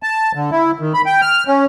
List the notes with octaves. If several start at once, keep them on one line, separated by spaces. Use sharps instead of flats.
A5
D3
E4
D#3
B5
G5
F6
C#4